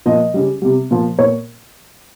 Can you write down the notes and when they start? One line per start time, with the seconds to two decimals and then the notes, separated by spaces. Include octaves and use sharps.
0.06 A#2 F3 D#5
0.34 C#3 G3
0.62 C3 G3
0.91 A#2 F3
1.18 A#2 C#5